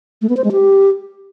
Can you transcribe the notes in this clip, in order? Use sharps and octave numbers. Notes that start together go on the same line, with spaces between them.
A3
B3
C5
G#3
G4